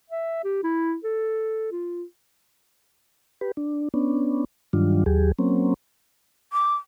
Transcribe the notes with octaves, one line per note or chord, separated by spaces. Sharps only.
E5
G4
E4
A4
F4
G4 B4
D4
B3 C#4 D4
G2 D#3 F#3 G3 D4 F4
D#2 F#3 G4 G#4
F#3 A#3 C4 C#4
D6